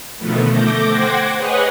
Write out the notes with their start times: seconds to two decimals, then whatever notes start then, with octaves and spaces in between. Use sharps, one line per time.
0.17 B2 D3 D#3 F3 A3 B3
0.50 A3 D6 G6 A#6
0.88 C5 F#5 G5 D6 G#6 A#6
1.35 G#4 B4 C#5 D#5 F#5 G#5